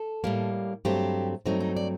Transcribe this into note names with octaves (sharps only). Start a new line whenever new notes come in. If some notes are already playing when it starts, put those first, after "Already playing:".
Already playing: A4
A2 G3 A#3
G2 F#3 A3 C4 G4
G2 F#3 A3 C4 D#4
D#4
D5